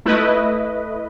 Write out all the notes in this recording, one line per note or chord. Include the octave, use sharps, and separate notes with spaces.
A3 E4 B4 D#5